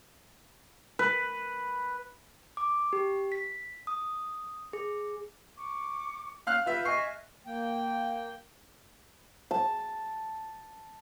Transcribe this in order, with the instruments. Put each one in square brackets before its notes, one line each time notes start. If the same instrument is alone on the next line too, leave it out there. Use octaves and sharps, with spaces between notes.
[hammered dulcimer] B4
[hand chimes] D6
G4
B6
D#6
G#4
[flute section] C#6 D6
[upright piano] F5 F6 F#6
[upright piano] F4 E5 [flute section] B4 E6 G6
[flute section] D#5 E5 G#5 [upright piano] C#6 C7
[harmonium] A#3 G5
[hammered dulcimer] A5